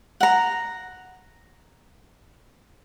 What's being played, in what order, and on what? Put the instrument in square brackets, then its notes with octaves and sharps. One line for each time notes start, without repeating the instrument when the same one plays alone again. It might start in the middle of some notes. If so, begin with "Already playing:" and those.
[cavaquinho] F#5 A#5